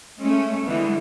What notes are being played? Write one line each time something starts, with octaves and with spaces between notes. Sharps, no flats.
G#3 A3 C#4
D3 E3 G3 G#3 B3